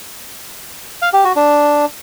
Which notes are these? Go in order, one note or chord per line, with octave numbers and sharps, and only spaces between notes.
F5
G4
F#4
D4